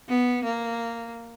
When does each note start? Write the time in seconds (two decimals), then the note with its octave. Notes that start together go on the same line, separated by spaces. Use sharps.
0.08 B3
0.44 A#3